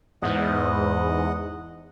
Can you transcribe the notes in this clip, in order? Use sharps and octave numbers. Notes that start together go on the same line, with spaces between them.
E2 G#2 D#5 F#5